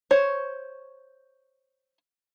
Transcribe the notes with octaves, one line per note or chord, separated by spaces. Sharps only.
C5 C#5